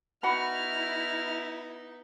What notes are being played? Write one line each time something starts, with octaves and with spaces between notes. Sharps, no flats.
B3 D#4 E4 F#4 F#5 B5 F6